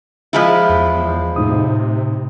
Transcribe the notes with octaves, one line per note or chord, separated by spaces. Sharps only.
F3 G#3 E4
E2
A2 C3 D#4 D#6